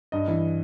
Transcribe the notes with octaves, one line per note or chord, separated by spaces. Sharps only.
G2 D#5
E3